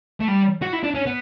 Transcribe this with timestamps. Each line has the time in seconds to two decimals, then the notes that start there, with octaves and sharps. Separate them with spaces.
0.20 A3
0.28 G3
0.62 F#4
0.73 E4
0.83 D4
0.95 C#4
1.06 B3